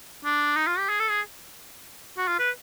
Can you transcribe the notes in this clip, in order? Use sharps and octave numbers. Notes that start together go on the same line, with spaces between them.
D4
D#4
F4
G4
G#4
A4
G#4
F#4
F4
B4